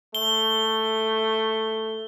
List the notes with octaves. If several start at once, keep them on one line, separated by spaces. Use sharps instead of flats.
A3 G7